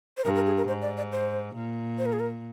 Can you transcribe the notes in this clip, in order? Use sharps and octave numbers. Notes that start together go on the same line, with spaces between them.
C5
G2 A#4
A#4
G#4
A#4
G#2 C5
D5
D5
C5
A#2
C5
A#4
G#4
A#4